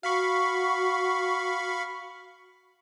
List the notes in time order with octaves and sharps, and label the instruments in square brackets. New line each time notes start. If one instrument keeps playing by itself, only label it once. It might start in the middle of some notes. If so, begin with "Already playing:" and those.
[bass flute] F#4 [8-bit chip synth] F5 B5 C#6